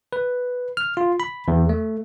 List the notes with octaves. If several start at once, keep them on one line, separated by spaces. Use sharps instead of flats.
B4
F6
F4
B5
E2
A3